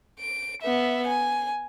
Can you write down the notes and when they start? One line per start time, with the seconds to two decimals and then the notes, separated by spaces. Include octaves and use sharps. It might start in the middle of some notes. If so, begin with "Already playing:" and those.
0.20 D7
0.62 B3 E5
1.07 G#5